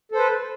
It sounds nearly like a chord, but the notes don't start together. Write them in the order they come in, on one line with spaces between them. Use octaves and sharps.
A4 C5 B4